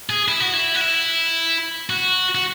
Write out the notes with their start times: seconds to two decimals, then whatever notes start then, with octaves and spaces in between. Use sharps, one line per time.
0.10 G#4
0.28 E4
0.40 F#4
0.53 E4
0.75 F#4
0.81 E4
1.90 F#4
2.35 F#4